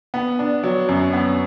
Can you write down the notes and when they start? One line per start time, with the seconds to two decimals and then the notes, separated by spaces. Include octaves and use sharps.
0.14 B3
0.39 D4
0.63 F#3
0.89 F#2
1.13 B3